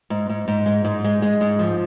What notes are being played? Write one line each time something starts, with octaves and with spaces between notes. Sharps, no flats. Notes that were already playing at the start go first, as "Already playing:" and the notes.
G#2
G#2
G#2
G#3
G#2
G#3
G#3
G#2
F3